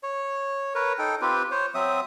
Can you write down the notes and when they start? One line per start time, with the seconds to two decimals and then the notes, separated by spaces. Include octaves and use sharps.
0.03 C#5
0.75 A#4 B4 C#5
0.99 D#4 A4 G5
1.22 C4 F4 G4 B4
1.51 C5 C#5
1.75 F#3 C4 E5 D#6